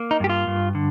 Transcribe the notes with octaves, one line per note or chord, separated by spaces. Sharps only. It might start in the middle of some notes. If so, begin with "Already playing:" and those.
Already playing: A#3
D#4
G2 G4
F4
G2
D3